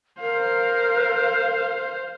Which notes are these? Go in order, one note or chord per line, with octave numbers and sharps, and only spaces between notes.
A#4 C5 F5